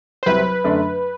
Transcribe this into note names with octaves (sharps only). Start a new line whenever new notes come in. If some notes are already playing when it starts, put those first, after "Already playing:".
C5
C2 C3 F#3 C4 E4 B4
F#2 D3 A3 D4